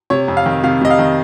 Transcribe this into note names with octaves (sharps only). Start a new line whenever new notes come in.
C3 C#5
F2
F5
D#3
C3 F5
C3 D#5
F5
D#3